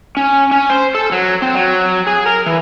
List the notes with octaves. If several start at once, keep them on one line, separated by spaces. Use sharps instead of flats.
C#4
C#4
C5
A4
F#3
C4
F#3
G#4
A#4
E3